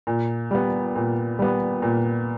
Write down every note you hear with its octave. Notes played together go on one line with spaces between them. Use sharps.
A#2
G3 B3
A#2
G3 B3
A#2